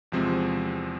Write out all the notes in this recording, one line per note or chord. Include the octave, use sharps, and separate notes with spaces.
E2 C3 F3 G#3 C4